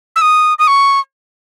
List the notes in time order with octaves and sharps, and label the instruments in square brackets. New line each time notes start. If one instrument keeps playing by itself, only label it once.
[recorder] E6
D#6
D#6
C#6